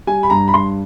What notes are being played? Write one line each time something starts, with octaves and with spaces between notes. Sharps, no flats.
G3 G#5
B5
G2 A#5
B5
G2 C6